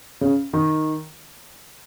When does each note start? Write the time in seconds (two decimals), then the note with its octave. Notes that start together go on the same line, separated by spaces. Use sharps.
0.21 C#3
0.53 D#3